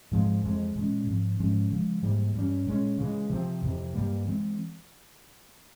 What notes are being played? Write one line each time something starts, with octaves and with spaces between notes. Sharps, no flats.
G#2 F3 G#3 C4
F2 E3 G#3
A#2 G#3 C#4
G#2 F3 C4
G#2 F3 G#3 C#4
C#3 F3 G#3
G#2 E3 G3 A#3
G2 G3 A#3 C#4
A#2 G#3 C#4
C#3 E3 G#3
C3 F3 C4
F2 C3 E3
G2 G3 A#3
E3 G#3 C4